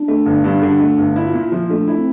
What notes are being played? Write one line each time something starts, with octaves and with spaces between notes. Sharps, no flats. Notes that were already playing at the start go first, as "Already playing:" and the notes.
Already playing: D4
A3
G1
G2
D3
A3
G1
E4 F4
A#2
F3
A3 D4
E4
C4